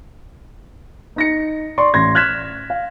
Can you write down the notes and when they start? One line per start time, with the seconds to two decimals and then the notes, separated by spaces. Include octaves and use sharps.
1.16 D#4 A#6 C#7
1.78 D5 C6 C#6
1.94 A1 C6 G#6 A#6
2.15 F6 F#6 G#6 B6 E7
2.70 F5